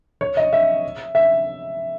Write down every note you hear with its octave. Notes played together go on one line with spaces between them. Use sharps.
C#5
D#5
E5
E5